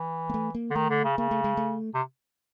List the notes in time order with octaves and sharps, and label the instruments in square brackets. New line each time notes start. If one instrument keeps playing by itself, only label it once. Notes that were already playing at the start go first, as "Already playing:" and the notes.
Already playing: [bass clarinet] E3
[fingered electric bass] A#3
A3
A#3
[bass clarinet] D3
[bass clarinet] D#3 [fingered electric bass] A3
[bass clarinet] D3
C#3
[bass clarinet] C#3 [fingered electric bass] A#3
[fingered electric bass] A3
G#3
A3
[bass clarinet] C3